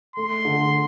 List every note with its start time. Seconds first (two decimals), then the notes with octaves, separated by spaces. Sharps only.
0.16 A3 C6
0.45 D3